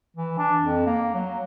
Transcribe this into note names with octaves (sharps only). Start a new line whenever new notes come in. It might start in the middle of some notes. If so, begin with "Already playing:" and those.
E3
D4
F2
A#3
F#3